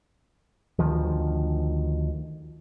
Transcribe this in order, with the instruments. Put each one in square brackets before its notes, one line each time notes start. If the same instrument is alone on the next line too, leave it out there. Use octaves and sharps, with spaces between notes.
[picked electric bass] D2 D#3 F3